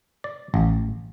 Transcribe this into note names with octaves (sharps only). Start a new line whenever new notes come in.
D5
A1